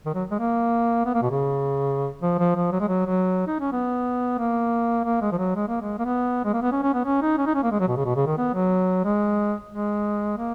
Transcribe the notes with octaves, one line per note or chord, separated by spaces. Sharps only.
D#3
F#3
G#3
A#3
B3
A#3
B2
C#3
F3
F3
F3
F#3
G#3
F#3
F#3
D#4
C#4
B3
A#3
A#3
G#3
F3
F#3
G#3
A#3
G#3
A#3
B3
G#3
A#3
B3
C#4
C#4
B3
C#4
D#4
C#4
D#4
C#4
A#3
G#3
F#3
B2
C#3
B2
C#3
D#3
B3
F#3
G#3
G#3
A#3